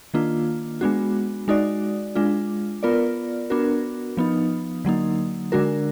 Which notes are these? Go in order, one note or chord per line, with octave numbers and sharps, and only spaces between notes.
D#3 A#3 D4 F4
G#3 B3 D4 F#4
G#3 D#4 F#4 D5
G#3 D4 F4
B3 F4 A#4 D5
B3 D4 F#4 A#4
F3 B3 D#4
D3 F#3 A#3 D#4
D3 G#3 D4 F#4 A#4